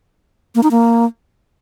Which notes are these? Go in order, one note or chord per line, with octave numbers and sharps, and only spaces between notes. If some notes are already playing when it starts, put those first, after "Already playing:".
A#3
D#4
A#3